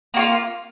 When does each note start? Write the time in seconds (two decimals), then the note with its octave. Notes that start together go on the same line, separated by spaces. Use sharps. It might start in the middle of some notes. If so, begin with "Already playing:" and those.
0.14 A#3
0.16 F#4
0.19 F4